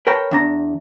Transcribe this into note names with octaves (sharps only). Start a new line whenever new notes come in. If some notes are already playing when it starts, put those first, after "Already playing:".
A#4 B4 C#5 G5 A5 A#5
E2 D4 A#5